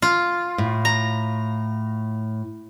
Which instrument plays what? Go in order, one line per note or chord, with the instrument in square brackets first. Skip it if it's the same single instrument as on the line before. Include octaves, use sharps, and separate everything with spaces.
[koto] F4
[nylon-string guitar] A2
[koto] A#5